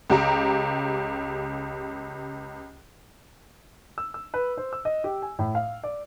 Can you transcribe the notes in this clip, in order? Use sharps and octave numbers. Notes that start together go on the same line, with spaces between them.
C#2 G4 A#5
E6
E6
B4
C5
E6
D#5
G4
G#5
A2
F5
D5